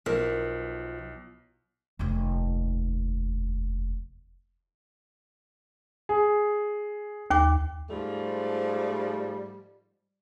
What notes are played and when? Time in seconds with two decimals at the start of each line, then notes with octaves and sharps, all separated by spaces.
0.06 B1 F3 A#4
1.99 F1 D#2
6.09 G#4
7.31 D#2 G5 D6
7.90 G#2 F3 G3 A3